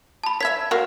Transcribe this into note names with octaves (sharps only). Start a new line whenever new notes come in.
A5 B5
C#5 E5 G#6 B6
F#4 A#4 F5